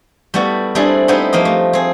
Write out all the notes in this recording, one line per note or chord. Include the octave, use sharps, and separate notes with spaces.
G3 A3 B3 E4 F#4
G3 A3 C4 D4 E4 G#4
B3 C4 D#4 E4 G4
F3 A#3 F4 D#5
A3
C4 G#4